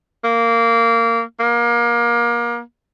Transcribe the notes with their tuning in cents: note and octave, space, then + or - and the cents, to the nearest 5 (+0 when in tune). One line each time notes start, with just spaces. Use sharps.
A#3 -15
A#3 +25